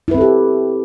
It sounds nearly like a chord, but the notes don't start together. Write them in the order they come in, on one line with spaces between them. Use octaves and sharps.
E4 B4 C4 A4 G4